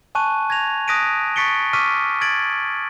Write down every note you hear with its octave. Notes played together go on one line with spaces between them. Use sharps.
G#5 A5 C#6 F#6 D#7
G#6 A#6 F7
D#6 F#6 A#6 B6 D7 D#7
C#6 A6 B6 C#7 D7 G7
C#6 D6 E6 F6 B6 D#7
G#6 A6 D7 F#7